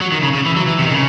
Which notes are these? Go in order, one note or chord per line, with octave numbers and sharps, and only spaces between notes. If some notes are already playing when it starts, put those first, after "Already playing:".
F#3
D#3
C#3
C#3
E3
F#3
E3
C3
D#3
C#3